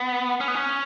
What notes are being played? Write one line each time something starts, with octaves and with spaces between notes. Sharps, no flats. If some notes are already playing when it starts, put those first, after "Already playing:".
Already playing: B3
C#4
B3
C#4